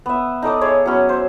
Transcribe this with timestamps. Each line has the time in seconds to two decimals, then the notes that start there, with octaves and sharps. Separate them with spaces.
0.06 B3 E5
0.42 D#4 A4 D5 D#6
0.61 G#4 C#5 D5 E5
0.86 F#3 B3 C#4 F#4
1.09 C5 E5